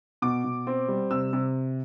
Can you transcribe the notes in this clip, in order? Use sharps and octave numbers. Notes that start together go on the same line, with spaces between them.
B2 D6
B2
C4
G3
C3 E6
C3